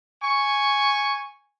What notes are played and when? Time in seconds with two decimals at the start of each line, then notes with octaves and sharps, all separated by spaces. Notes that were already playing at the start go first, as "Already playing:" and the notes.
0.23 G#5 C#6